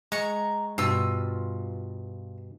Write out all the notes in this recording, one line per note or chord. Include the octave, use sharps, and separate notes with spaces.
G#3 A#5 C#6
G2 B2 F4 E6